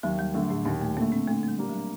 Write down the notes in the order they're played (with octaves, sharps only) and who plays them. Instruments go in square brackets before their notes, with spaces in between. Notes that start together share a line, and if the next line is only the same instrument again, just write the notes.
[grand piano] D#2 [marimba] F#3
[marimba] G3
[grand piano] D3 A3 [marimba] F#3
[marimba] A2
[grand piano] D#2 [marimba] A#2
[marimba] A3
[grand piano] D3 [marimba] A#3
[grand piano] A3
[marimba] C4
[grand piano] D3 [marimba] A3
[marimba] A3
G3
[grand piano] G3 A#3 D4
[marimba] F#3